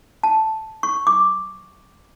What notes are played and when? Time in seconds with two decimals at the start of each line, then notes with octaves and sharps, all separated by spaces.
0.23 A5
0.83 C#6
1.07 D6